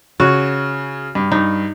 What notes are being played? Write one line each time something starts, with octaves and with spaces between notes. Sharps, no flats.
C#3 F#4 C#5
G2
G2 D#4